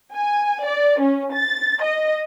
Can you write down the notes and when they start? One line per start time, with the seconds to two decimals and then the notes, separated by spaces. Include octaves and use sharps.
0.15 G#5
0.64 D5
1.01 C#4
1.34 A6
1.83 D#5